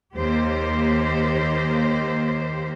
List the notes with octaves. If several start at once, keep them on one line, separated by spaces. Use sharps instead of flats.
D#2 A#3 G4 C5